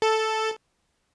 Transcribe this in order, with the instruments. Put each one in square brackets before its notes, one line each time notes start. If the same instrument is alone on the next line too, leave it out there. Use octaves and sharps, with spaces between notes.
[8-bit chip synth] A4